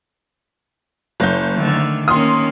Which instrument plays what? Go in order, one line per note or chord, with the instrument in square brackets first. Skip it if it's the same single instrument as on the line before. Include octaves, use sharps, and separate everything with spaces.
[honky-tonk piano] F#1 G6
[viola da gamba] D3 D#3 A3
[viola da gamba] D#3 A#3 C#4 [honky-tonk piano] C6 D#6